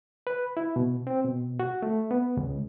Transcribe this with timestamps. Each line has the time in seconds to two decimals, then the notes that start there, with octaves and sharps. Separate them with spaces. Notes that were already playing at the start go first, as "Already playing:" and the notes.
0.27 B4
0.57 E4
0.76 B2
1.07 C4
1.25 B2
1.60 F#4
1.82 A3
2.11 B3
2.37 C#2